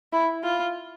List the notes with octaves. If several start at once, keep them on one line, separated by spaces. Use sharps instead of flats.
E4
F4